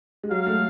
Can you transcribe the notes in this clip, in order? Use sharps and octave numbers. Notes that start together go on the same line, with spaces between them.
G#3
F#3 F5
A3